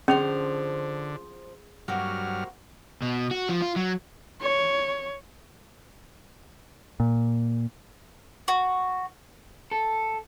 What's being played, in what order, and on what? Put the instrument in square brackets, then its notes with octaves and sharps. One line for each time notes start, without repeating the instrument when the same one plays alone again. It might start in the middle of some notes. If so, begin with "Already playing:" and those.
[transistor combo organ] D3 [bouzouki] F3 C5 [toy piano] C#4 [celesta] G#4 F7
[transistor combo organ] G2 F#3 F6 [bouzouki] A#3 C4 F#4
[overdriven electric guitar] B2
F#4
F3
F4
F#3
[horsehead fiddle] C#5
[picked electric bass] A#2
[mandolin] F#4
[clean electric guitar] A4